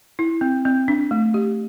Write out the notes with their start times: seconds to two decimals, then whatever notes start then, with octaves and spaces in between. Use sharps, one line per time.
0.19 E4
0.41 C4
0.65 C4
0.88 D4
1.11 A3
1.34 G4